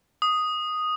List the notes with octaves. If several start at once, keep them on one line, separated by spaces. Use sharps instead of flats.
D#6